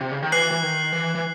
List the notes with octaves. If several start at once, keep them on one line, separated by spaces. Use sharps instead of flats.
C3
C#3
D#3
E3 F#6 C7 F#7
E3
D#3
E3
E3